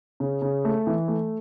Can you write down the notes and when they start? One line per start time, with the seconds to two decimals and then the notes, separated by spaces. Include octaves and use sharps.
0.20 C#3
0.42 C#3
0.65 A3
0.87 E3
1.08 A3